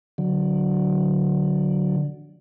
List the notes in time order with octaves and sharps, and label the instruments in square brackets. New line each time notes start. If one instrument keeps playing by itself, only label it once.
[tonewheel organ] D3 F#3